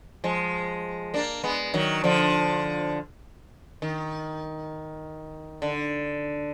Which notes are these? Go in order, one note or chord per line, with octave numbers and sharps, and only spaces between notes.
F3 G#3
A#3 D4
G#3 B3
D#3 F#3
D3 F3
D#3
D3